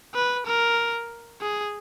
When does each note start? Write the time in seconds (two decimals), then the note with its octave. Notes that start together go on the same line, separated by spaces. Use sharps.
0.15 B4
0.47 A#4
1.41 G#4